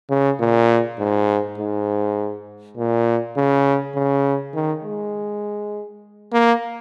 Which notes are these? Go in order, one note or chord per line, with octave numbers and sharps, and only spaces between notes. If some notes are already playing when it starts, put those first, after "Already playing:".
C#3
A#2
G#2
G#2
A#2
C#3
C#3
D#3
G#3
A#3